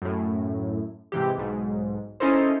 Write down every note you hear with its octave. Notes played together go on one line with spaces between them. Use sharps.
F#2 A2
G#2 C3 E3 G4
B1 G#2
C#4 D#4 E4 A4 A#4 C5